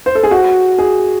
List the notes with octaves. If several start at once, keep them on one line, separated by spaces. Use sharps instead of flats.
C5
A4
G#4
F#4
G#4